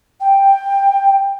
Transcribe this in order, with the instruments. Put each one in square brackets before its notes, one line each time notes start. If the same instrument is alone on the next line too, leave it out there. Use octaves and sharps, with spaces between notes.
[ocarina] G5